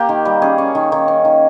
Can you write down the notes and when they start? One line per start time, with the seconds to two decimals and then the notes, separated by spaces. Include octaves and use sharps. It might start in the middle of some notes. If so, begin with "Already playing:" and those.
Already playing: A#3 G4
0.09 D#3
0.25 G3
0.42 C#4 G#4
0.58 C#4
0.75 D#3
0.92 D#3
1.08 C#4
1.25 D#3